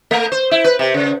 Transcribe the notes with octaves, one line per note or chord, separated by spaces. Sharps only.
A3
C5
E4
B4
C3
C#3